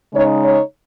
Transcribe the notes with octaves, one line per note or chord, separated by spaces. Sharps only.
C#3 G#3 D#4 C#5
C#5